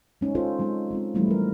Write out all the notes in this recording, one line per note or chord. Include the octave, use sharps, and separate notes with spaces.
G#3 C#4 D#4
C#4 F4 A4 C5
F#3 G#3 C4 C#4 D#4
G#3 C4 F4
E3 F3 G3 A3 B3 E4
G3 A#4